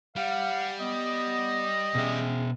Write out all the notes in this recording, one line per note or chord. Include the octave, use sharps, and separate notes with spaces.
G3 F5 F#5
B3 D#5
B2 C#4 G#4 E5